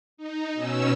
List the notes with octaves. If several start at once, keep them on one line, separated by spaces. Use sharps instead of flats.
D#4
B2 C#4 E6